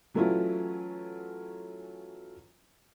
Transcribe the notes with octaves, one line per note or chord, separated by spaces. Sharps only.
E3 F#3 A3 C#4 E4 F4